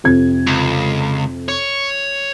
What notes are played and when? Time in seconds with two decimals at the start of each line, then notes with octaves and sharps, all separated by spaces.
0.04 F2 C3 G#6
0.47 C#2
1.48 C#5